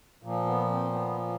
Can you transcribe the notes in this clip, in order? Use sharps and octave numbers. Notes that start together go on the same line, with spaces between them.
A#2 F3
B3
C4
B3